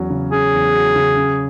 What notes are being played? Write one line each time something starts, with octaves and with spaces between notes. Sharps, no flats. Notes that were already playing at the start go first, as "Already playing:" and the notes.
Already playing: E2 F#3 C#4
C#3
C#4 G#4
E2
F#3
C#3
C#4